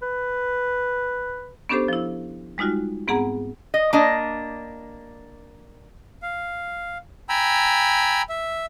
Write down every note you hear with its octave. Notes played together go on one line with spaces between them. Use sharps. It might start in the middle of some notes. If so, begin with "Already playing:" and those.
B4
B3 C#4 D4 G4 A4 C5
F3 E4
G3 G#3 D#4 F4 F#4
G#2 B3 C4 G#4 F#5 A#5
D#5
A#3 D4 D#5
F5
G5 G#5 A#5 B5 E6
E5